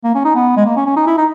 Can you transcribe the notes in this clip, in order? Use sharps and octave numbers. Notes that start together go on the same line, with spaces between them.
A#3
C#4
D#4
B3
G#3
A#3
C#4
C#4
D#4
E4
D#4